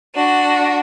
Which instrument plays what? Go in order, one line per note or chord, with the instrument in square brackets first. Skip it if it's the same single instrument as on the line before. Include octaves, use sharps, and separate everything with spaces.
[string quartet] D4 F#4